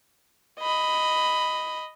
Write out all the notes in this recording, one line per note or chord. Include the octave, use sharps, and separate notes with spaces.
D#5 B5